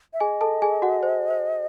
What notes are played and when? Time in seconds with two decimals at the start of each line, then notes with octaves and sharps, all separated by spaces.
0.13 E5
0.20 G#4 D#5 G#5
0.41 A4 A5
0.62 G#4 G#5
0.82 F#4 F#5
1.03 C5
1.31 C5